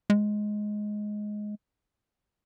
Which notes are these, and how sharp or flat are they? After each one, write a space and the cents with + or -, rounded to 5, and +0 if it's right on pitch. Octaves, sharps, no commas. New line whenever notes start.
G#3 +10